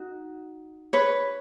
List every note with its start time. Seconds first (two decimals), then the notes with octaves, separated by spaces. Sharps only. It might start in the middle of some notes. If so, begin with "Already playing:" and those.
Already playing: D#4 F#4
0.93 B4 C#5